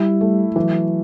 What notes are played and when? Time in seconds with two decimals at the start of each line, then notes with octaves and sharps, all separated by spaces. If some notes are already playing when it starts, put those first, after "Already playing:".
Already playing: G3 E4
0.21 A3
0.56 E3 F#3